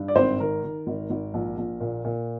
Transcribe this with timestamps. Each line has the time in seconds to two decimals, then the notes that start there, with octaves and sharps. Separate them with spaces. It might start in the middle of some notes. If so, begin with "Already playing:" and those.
Already playing: G2
0.08 D5
0.16 G#1 C4 C5
0.40 D#3 A#4
0.64 D#3
0.87 G#1
1.10 G#1
1.34 A#1
1.57 A#1
1.80 A#2
2.05 A#2